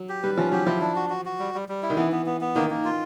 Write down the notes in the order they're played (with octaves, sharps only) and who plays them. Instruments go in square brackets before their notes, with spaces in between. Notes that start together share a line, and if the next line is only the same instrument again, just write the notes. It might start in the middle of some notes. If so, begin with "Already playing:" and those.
Already playing: [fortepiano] F#3
[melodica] G4
[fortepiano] G3 [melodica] B4
[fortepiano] F3 [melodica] C#4
[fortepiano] F#3 [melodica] G4
[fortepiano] F3 [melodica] E4
[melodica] D4
F#4
F#4
F#4
G3
G3
G3
E4
[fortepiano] D#3
[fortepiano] E3 [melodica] B3
[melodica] B3
B3
B3
[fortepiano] D#3 [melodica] A#3
[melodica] A#3
F4